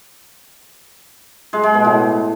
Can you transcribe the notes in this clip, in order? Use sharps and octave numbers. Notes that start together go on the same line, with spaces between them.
G#3
G#3
B2
A2